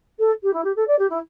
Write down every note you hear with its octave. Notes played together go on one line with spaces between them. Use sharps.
A4
G4
E4
G4
A4
D5
G4
E4